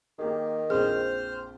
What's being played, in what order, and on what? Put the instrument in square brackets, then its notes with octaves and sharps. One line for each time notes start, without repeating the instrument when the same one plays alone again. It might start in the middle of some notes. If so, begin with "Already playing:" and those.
[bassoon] D#3 [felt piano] A#3 G4 G#4
[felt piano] A#1 F2 C4 [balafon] G#4 [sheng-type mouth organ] C5 F6